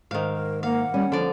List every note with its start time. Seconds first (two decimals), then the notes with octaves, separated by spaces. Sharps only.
0.11 G#2 D#3 F5
0.35 A#4
0.63 A#3 F5 F#5
0.94 G3 C#4
1.12 D3 F3 D5